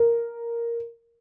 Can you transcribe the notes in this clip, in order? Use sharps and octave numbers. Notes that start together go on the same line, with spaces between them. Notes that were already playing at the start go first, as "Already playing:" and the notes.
Already playing: A#4